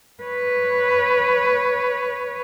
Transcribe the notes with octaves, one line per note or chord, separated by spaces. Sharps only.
B4 C#5